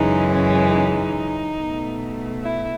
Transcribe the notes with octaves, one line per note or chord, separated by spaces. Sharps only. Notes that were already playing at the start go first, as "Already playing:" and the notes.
Already playing: F#2 C#3 E3 G#3 D#4
C#4
D#4
B2 A3
E4